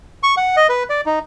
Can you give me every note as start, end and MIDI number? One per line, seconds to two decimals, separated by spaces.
0.23 0.35 85
0.37 0.56 78
0.57 0.67 75
0.69 0.83 71
0.89 1.01 74
1.06 1.19 63